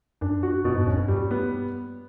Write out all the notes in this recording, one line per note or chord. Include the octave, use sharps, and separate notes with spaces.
F#2 D4
F#4
F#2 B2
G#2
F2 C#4
G2
G3
B3